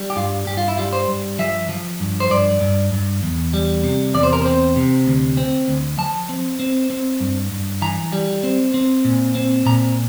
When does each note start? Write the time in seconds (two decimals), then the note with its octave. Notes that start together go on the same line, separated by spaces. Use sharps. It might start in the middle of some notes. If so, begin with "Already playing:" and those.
Already playing: G3
0.10 G4
0.16 G2 F4
0.47 G2 G4
0.57 F4
0.68 E4
0.78 G3 F4
0.93 C5
1.08 G2
1.39 F3 E5
1.69 F3
2.00 G2
2.20 C5
2.30 G2 D5
2.61 G2
2.92 G2
3.23 E2
3.53 G3
3.84 C3
4.14 E2 D5
4.23 C5
4.33 A#4
4.42 C4 C5
4.76 C3
5.06 D2
5.37 C4
5.68 D2
5.98 F3 A5
6.29 C4
6.60 C4
6.90 C4
7.20 G2
7.52 G2
7.82 E3 A#5
8.13 G3
8.43 C4
8.74 C4
9.05 A#2
9.35 C4
9.66 A#2 A#5